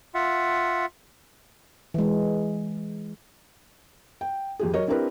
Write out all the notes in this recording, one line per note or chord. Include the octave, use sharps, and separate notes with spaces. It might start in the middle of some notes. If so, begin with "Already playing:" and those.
F4 E5 F#5
E3 G#3
G5
F2 G4 G#4
F#3 A#4 C#5 D#5
C4 D4 E4 G4 A#4 B4